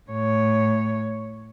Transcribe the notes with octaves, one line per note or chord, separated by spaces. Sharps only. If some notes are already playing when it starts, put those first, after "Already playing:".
A2 C#5